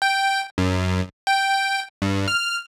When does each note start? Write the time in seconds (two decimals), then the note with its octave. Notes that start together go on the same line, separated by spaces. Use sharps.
0.02 G5
0.58 F#2
1.27 G5
2.02 G2
2.28 F6